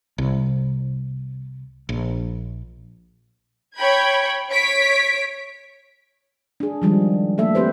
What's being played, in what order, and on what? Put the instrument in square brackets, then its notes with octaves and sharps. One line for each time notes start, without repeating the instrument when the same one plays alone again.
[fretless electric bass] C2
A#1
[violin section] C#5 G5 B5 G#6
C#5 B6 D7
[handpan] D4 G#4
D#3 F3 G3 G#3
F3 A3 A#3 A4 E5
C4 G4 B4 C5